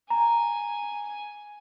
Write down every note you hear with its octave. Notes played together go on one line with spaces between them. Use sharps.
G#5 A#5